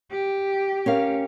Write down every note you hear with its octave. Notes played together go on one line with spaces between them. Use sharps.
G4
C#4 A#4 F5